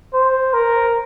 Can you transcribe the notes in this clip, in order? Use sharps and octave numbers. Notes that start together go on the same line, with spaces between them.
C5
A#4